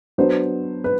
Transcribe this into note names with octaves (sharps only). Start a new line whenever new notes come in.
F#3 B3 D4 C5
B4